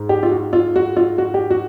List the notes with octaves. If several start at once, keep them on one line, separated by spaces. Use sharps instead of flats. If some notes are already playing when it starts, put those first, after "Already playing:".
Already playing: G#2
G4
F4
F#4
F4
F#4
F4
F#4
G4
F#4